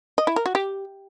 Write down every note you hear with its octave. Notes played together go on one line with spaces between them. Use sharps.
D#5
E4
A#4
F#4
G4